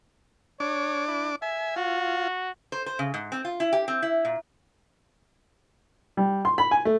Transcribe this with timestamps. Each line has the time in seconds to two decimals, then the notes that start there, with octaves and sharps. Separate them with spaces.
0.60 D4 C#5 D6
1.08 E4
1.42 E5 G#5
1.76 F4 F#4
2.72 C5
2.86 C5
2.99 C#3
3.14 G#2
3.32 C4
3.45 F4
3.60 E4
3.73 G4
3.88 C4
4.03 E4
4.25 A#2
6.17 G3
6.45 C6
6.58 B5
6.71 G#5
6.85 A3